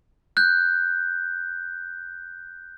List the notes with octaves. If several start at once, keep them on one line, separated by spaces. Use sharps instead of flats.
F#6 G6